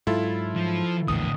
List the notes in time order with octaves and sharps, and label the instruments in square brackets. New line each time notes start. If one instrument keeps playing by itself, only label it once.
[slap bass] G#2 F#3 [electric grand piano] E4 F4 A4
[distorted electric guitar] F3
[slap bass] A#1 E2 E3 [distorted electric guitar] A2 D3 [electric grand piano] D#6